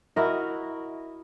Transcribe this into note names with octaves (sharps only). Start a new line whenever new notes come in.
E4 F#4 A#4 D#5